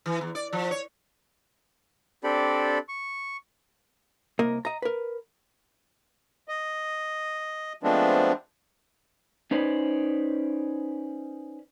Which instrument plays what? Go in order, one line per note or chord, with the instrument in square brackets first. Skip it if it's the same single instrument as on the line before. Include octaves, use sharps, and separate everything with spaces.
[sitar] E3
E2
D5
F3
C#5
[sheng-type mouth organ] C4 D4 G4 A4 D5 B5
C#6
[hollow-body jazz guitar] C2 A#3 A#4 D#5
D#5 A#5
A#4 B4
[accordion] D#5
F3 G#3 A3 B3 C4 D4
[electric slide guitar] C#4 D#4 B4 C5 D5